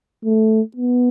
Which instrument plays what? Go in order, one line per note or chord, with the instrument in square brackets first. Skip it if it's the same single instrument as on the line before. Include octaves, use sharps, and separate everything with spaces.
[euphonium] A3
B3